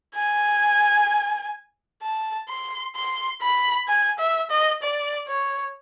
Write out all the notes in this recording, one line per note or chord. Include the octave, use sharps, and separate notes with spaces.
G#5
A5
C6
C6
B5
G#5
E5
D#5
D5
C#5